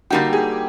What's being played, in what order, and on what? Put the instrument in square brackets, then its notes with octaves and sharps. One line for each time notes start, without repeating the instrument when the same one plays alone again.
[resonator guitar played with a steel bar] D3 G3 A#3 D#4 F#4 [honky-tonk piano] G4
[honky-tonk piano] G#4